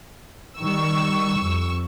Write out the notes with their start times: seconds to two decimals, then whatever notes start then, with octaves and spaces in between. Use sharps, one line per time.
0.58 D#3 G3 C#6 E6
1.37 F2